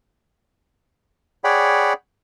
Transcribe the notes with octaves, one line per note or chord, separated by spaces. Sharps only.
G#4 C#5 D5 F#5 G5 B5